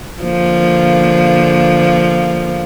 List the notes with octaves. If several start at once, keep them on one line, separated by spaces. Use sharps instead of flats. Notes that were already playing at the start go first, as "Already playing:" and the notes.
D3 F3 A#3